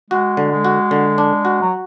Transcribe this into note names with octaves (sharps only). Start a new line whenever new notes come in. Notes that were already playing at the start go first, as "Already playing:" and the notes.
G#3 F#4
D3
G#3
F#4
D3
D4
F#4
F#3